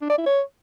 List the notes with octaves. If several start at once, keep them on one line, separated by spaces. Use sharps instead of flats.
D4
D5
E4
C#5